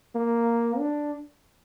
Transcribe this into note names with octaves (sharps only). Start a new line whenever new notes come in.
A#3
D4